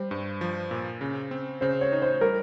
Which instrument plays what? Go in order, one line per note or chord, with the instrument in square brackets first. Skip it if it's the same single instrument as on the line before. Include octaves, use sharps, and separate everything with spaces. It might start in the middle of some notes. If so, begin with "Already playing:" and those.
Already playing: [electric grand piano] G3 [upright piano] C5
[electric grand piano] G2
F3
A#2
C#3
C4
[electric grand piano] C#3 [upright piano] C5
[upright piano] C#5
[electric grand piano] D#4
[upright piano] C5
[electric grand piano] G3 [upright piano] A#4